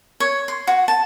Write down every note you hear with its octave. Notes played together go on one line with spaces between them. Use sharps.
C#5
C6
F#4
A5